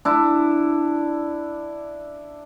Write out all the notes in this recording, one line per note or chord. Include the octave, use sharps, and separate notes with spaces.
D4 E4